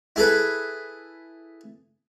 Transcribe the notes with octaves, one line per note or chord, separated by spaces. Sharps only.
E4 G#4 A4 B4